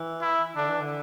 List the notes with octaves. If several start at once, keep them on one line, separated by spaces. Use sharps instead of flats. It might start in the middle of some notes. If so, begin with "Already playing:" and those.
Already playing: E3
E4
D3 D4
E3
D3